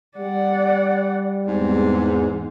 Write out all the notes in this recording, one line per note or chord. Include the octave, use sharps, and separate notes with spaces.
G3 D5 F#5
E2 G#2 C4